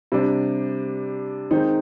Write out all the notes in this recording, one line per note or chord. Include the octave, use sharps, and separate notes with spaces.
C3 G3 D4
D#3 G#3 C4 D#4